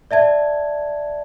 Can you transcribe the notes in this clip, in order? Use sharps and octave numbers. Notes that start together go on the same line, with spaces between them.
D5 E5 A5 G#6